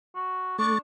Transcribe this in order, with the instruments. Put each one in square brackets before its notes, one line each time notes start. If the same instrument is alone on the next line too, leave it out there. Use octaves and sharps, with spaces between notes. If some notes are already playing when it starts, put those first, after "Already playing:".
[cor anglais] F#4
[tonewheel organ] A3 A6 [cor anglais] D4 [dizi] C#6